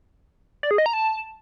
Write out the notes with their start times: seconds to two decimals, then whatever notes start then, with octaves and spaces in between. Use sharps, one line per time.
0.63 D5
0.71 G#4
0.78 D#5
0.86 A#5
0.93 A5